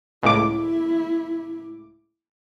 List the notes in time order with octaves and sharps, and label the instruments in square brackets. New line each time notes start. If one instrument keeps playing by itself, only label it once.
[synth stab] C#2 A2 D6 [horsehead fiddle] E4